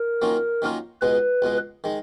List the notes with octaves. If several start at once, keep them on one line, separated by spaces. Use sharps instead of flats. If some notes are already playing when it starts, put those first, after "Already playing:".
Already playing: A#4
D#3 F#3 A#3 C#4 F4
D#3 F#3 A#3 C#4 F4
C#2 B2 G#3 B4
C#2 B2 G#3
D#3 G#3